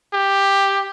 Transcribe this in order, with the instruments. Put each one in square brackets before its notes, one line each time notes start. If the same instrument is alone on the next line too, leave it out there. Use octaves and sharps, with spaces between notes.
[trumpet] G4